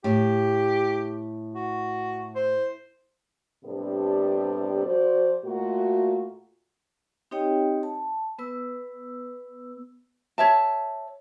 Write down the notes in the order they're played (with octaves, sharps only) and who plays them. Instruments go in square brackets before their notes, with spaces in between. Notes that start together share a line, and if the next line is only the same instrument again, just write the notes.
[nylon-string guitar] A2 [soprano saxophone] G4
[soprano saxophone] F#4
C5
[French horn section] A2 C3 G3 B3 D4 A4
F3 F#4 C5 D5
A#2 A3 F4 F#4
[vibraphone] C4 D#4 G4 C#5 D#5 G5
A5
B3 B4 E6
[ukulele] C#5 E5 A5